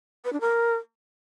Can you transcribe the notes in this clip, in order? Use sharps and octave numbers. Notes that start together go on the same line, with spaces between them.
B4
D4
A#4